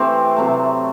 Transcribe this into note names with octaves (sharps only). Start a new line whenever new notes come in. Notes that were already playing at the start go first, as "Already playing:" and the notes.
Already playing: E3 A3 C4 G4
C3 F#3 A3